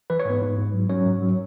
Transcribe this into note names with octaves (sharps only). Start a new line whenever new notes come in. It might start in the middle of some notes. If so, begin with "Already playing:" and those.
E3 B4
C#5
G#2 B3 B4
G#2
G#2
F#3
F#3 C#4 C#5
G#2
F#3